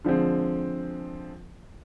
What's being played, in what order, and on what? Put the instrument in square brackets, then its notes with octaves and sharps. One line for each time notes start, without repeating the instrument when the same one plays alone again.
[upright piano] D3 F3 G#3 C4